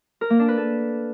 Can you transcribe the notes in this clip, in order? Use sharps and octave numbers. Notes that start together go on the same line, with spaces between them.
A#4
A#3
D4
B4
A4